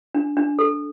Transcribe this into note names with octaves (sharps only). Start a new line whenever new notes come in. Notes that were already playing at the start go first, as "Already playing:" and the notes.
D4
D4
A4